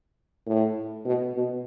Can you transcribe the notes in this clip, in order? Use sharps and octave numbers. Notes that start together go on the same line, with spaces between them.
A2
B2
B2